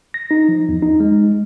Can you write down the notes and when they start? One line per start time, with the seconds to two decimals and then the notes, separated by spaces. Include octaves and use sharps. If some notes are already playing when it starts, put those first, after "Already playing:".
0.14 A#6
0.31 D#4
0.49 F3
0.69 E2
0.82 D#4
1.00 G#3